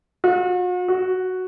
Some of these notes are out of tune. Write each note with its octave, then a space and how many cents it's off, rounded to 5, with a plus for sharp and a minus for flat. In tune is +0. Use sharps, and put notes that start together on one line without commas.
F#4 -45
F#4 +0